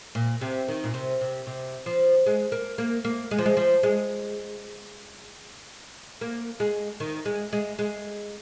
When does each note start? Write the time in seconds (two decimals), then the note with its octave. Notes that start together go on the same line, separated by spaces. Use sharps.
0.15 A#2
0.41 C3
0.68 D#3
0.84 A#2
0.94 C3
1.21 C3
1.47 C3
1.86 F3
2.26 G#3
2.52 A#3
2.78 A#3
3.05 A#3
3.31 G#3
3.38 F3
3.46 G#3
3.57 F3
3.83 G#3
6.21 A#3
6.60 G#3
7.00 D#3
7.25 G#3
7.53 G#3
7.79 G#3